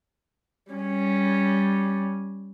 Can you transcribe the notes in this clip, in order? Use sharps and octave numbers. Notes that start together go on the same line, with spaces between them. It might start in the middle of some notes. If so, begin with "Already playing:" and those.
G3 C#4